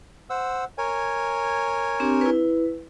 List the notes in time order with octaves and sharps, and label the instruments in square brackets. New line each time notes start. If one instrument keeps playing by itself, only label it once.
[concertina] C5 F#5 E6
A#4 C#5 G#5
[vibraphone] C4 D4 G4
E4 B4